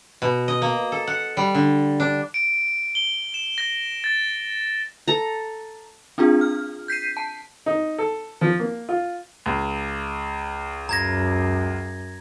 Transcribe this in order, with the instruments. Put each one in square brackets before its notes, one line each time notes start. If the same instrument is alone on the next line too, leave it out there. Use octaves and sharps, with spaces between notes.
[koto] B2
D#5
A#3
A4
F#5
G3
D3
D4
[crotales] D7
G7
E7
A#6
A6
[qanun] A4 A#5
[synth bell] C4 D4 F4 G#4
F6
G6 B6 C7 D#7
A5
[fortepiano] D#4
A4
F3
A#3
F4
[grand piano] C#2
[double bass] F#2 [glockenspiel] A#5 G#6 A#6